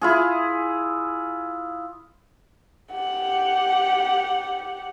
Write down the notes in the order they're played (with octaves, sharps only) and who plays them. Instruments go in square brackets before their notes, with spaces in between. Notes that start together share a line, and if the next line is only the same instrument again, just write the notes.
[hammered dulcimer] E4 F4 G#4
[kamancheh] G4 F#5